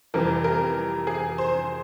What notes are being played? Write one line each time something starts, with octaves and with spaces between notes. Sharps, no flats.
F2 C3 E3 G3 A#4
A#4
G#4
C5